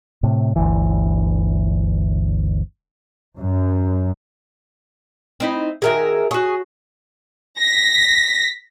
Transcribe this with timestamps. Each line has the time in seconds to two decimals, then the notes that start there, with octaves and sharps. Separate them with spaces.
0.23 A2 C3
0.56 G1 D2 E3
3.36 F#2
5.40 C4 D#4 E4
5.82 D#3 F#4 G#4 A#4 E5
6.31 F#4 G#4 C#5
7.59 A#6 B6